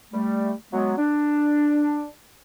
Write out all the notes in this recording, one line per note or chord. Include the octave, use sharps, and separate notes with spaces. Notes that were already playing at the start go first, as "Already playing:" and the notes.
G3 A3
F#3 G#3 B3
D4